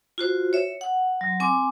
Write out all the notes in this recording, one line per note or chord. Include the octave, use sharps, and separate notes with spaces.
F4 F#4 C5
C#5 E5
F#5
F#3
C4 G#5 C#6 D6